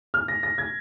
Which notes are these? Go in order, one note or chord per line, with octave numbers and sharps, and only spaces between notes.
F6
A#6
A#6
G#6